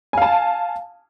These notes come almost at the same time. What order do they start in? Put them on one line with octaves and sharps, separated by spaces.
G#5 F5 A5